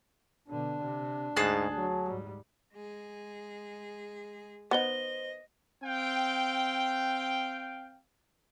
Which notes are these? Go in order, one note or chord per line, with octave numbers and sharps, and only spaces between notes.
B2 D3 D4
C3
D2 G#2 G#4 A5 F#6
F#3
G#2 G3
G#3 G#4
B3 D#4 C5 D#5 G7
C4 F5 G5